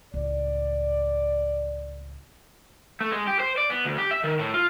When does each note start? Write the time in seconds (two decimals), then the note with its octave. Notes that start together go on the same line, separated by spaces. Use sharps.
0.14 C#2 A2 D5
3.01 A3
3.12 G#3
3.27 G4
3.39 C5
3.57 D5
3.70 B3
3.85 D2
3.98 G4
4.11 E5
4.24 D#3
4.40 A2
4.54 F4